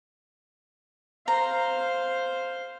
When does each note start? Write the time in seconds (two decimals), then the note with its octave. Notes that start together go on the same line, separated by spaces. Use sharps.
1.28 C5 F5 A#5